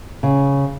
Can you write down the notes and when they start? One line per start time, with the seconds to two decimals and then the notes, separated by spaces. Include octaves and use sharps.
0.23 C#3